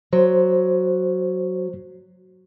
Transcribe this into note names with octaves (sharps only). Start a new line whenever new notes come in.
F#3 C5